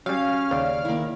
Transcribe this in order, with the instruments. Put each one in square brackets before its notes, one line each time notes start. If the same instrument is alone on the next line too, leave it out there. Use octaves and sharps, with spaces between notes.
[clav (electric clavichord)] F#3 G3 [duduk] C#4 [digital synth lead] F5
[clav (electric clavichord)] D#2 C#3 [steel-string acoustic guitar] C#5 D5
[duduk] D#3 [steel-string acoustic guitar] A#3 E4